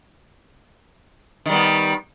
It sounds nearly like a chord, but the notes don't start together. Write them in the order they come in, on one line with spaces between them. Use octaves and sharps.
D#3 G3 B3